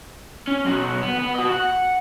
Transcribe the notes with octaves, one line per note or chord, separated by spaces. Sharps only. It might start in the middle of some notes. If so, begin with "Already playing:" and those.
C#4
B1 F#4
B3
B3
F#4 D#5
F#5